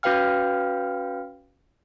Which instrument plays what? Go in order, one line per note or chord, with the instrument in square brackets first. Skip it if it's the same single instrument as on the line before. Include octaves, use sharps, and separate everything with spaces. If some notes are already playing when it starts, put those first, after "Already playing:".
[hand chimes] C#4 F#4 B4 F5 G5 F6